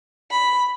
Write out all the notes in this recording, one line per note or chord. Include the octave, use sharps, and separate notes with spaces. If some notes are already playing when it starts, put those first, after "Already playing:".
B5